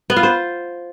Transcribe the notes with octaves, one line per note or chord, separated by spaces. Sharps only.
B3
F4
C5